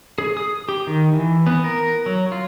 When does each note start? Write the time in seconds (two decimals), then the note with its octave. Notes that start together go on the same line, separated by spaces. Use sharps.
0.18 G#4
0.37 D#6
0.69 G4
0.87 D#3
1.13 E3
1.47 B3
1.64 A#4
2.06 F#3
2.32 F4